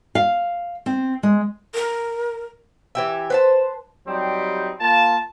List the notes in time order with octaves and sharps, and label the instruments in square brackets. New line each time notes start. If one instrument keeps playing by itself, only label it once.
[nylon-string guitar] F5
C4
G#3
[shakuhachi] A#4
[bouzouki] E3 G4 E5
B4 C5 A5
[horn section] F#3 G3 C4 D#4 G4
A#3 F4 A5